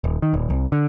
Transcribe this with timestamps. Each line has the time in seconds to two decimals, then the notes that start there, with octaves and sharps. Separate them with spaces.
0.04 D#1
0.22 D#3
0.34 D#1
0.50 C2
0.72 D3